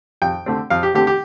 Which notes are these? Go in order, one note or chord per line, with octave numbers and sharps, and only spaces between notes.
F2 G5
D3 A3 C4
F2 F5
G4
D3 A3 C4 G4
G4